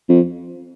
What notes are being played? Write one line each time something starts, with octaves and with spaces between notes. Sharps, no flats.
F2